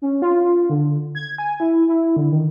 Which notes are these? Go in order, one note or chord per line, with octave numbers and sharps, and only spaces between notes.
C#4
F4
F4
D3
G#6
G#5
E4
E4
D3
D#3